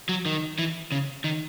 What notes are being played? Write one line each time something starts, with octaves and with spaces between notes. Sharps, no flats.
F#3
D#3
E3
C#3
D#3